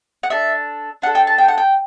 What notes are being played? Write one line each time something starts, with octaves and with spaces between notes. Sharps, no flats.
F#5
D4 A4 E5
D4 A4 F#5
G5
A5
G5
F#5
G5